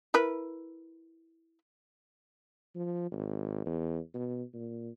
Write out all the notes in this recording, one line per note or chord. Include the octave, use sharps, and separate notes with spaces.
E4 A#4 B4
F3
G#1
E2
B2
A#2